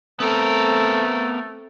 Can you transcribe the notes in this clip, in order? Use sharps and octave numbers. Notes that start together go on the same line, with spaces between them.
A3 B3 C4 A4 A#4